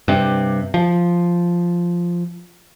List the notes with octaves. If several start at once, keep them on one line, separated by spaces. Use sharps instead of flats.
G2 C3
F3